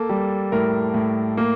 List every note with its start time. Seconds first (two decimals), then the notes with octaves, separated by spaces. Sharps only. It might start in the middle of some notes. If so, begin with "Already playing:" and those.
Already playing: A#3 A4
0.09 G3
0.52 A2 A#4
0.94 A2
1.37 A#3